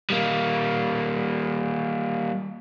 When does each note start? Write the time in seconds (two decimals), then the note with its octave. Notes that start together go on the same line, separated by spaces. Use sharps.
0.10 G3 A#3